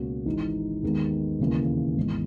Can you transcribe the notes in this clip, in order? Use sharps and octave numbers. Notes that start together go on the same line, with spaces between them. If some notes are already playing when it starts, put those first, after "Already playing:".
Already playing: C#2 B2 A#3 C#4 F#4
G#1 G#2 E3 G#3 D#4
D#2 D#3 G#3 B3
E1 D#2 C#3 E3 A#3
G#1 G#2 E3 G#3 B3